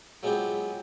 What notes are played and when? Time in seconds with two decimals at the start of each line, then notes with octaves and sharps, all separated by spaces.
0.23 F#3 G#3 B3 C4 F4 G4